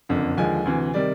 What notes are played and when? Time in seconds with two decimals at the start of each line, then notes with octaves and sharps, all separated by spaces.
0.09 F#1 F2 D3
0.37 D#2 D3 F3 G#3 G#5
0.65 D2 C3 E3
0.94 C3 D#3 G3 D5